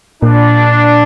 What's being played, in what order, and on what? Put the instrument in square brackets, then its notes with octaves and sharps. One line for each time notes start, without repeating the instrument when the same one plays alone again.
[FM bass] A#2 [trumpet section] D4